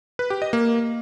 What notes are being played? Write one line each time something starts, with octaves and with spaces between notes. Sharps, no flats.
B4
G4
D#5
A#3